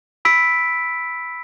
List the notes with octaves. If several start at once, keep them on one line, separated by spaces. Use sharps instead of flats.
B5 E6 B6 D7